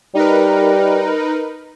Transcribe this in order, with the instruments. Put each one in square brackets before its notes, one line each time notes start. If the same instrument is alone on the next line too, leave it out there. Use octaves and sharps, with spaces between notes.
[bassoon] G3 [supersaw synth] D#4 A#4 B4